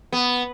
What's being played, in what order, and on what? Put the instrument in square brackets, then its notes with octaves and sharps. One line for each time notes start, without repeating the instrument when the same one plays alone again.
[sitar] B3